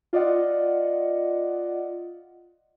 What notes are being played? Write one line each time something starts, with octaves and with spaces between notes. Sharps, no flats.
F4 D5 D#5 F#5